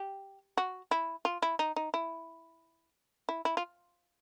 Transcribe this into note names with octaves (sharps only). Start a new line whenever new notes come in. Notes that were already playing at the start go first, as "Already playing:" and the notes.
Already playing: G4
F#4
E4
F4
E4
D#4
D#4
E4
E4
E4
F4